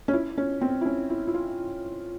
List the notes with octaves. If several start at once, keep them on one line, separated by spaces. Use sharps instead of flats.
C#4
E4
C#4
C4
E4
C#4
E4
E4
F4